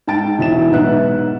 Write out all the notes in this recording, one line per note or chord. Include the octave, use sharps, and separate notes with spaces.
G#2 G5 A5 A6 D7
E1 E4 E5 E7
B1 G#2 B3 E5 F#6